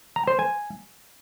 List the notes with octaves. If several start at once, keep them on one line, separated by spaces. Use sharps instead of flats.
A#5
C5
G#5